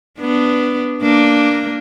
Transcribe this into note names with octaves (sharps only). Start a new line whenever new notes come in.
B3 D4
A#3 D4